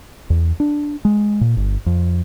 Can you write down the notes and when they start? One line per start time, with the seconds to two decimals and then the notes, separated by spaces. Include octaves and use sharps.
0.30 E2
0.60 D4
1.05 G#3
1.41 A#2
1.57 G1
1.86 F2